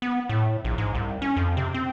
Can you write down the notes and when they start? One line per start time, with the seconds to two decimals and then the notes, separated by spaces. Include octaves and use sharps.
0.02 B3
0.29 A2
0.65 A#1
0.78 G#2
0.95 C2
1.22 C#4
1.37 F2
1.57 C3
1.74 C4